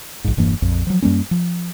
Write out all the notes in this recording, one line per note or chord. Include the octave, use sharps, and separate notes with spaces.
A#1 G#2
E1 G2 E3 A#3
A#1 F2
F3 F#3
F#2 G3 A#3 C#4
F3